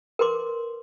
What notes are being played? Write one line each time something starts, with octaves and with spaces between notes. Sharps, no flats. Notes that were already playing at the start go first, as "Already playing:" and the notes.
A#4 B4 C6 D6